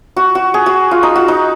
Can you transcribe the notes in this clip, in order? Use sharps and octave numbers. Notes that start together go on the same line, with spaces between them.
F#4
F#4
G#4
F#4
F4
D#4
F#4
D#4